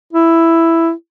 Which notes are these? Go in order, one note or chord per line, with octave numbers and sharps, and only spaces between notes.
E4